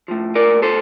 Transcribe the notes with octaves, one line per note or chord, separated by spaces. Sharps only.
A2 F3
A#4 D5
A4 C5